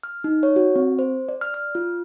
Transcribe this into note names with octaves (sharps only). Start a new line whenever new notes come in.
F6
D#4
C#5
F#4
C4
C5
D5
F6
F6
F4